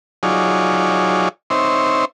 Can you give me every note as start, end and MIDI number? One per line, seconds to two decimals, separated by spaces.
0.23 1.29 54
0.23 1.29 63
0.23 1.29 65
0.23 1.29 68
0.23 1.29 73
0.23 1.29 74
1.50 2.05 60
1.50 2.05 63
1.50 2.05 72
1.50 2.05 73
1.50 2.05 76